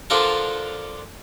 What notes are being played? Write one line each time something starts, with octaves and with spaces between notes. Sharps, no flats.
D3 F3 D4 F4 A4 A#4